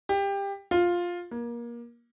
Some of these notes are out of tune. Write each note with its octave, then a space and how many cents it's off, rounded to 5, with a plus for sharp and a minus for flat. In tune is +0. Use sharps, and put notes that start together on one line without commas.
G4 +20
F4 +5
A#3 +25